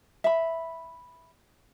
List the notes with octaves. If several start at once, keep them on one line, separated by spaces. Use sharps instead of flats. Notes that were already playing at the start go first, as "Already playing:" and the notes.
E5 B5